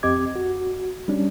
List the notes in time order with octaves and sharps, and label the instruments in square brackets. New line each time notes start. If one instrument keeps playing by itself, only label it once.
[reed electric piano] F2 C4 G4 D#5 D6 G#6
F#4
G3 C#4 D4